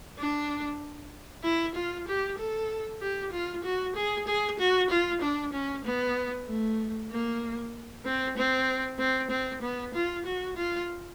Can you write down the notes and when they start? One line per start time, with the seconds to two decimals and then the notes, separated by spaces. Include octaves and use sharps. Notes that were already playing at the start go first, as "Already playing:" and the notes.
0.18 D4
1.43 E4
1.75 F4
2.07 G4
2.38 A4
3.01 G4
3.32 F4
3.64 F#4
3.95 G#4
4.27 G#4
4.59 F#4
4.90 F4
5.21 D4
5.53 C#4
5.84 B3
6.47 A3
7.10 A#3
8.05 C4
8.37 C4
8.99 C4
9.30 C4
9.62 B3
9.94 F4
10.25 F#4
10.56 F4